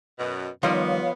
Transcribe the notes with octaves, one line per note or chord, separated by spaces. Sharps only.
F#2 B2
D#3 F3 G3 B3 F4 C#5 D#5 F5